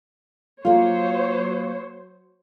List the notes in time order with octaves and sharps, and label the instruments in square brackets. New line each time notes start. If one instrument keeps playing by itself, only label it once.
[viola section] F#3 C5 C#5 [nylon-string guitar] A#3 F4